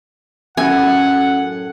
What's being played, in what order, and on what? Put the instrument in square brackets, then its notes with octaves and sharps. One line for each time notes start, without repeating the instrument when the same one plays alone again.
[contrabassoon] F#2 [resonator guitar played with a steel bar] A2 A3 [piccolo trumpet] F#5 [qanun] G#5